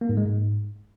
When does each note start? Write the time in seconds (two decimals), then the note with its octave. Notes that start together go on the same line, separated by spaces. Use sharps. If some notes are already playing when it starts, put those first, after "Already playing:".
0.01 A#3
0.09 G#2
0.17 G#3
0.25 G#2